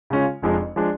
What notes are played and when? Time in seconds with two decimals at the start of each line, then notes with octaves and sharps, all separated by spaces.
0.10 C#3 G#3 C#4 F4
0.42 F1 F2 F3 G#3 D4
0.76 F3 G#3 D4